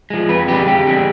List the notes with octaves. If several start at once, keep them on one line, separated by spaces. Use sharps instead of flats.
F3 G#3
F2 B4
D3 G#3 G4
F2 G4
D3 G#3